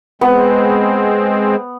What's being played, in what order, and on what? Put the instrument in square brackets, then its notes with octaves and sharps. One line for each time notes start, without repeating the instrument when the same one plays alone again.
[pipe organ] G#3 C4 [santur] B3